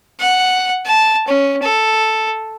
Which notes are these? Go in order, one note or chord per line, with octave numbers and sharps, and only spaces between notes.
F#5
A5
C#4
A4